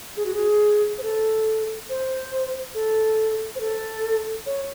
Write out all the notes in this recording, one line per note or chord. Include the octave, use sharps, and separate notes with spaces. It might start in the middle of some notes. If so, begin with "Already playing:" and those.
G#4
F#4
G#4
C5
A4
C5
A4
C5
A4
C#5